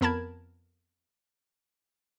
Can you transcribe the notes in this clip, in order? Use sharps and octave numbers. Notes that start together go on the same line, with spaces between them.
F2 B3 A#4 A5 B5 G#6